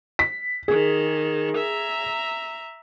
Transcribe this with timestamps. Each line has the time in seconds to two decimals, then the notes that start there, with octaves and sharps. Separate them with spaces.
0.19 B6
0.68 D#3 G#4
1.57 E5 A#5